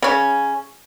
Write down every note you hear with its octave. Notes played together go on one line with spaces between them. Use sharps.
C#3 C#4